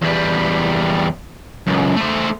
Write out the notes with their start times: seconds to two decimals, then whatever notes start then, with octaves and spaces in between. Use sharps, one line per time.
0.02 E2 G3
1.67 C#2 F#2
1.96 A3 C5